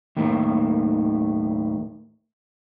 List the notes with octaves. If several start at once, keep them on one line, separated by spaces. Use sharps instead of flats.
D#2 A2 D#3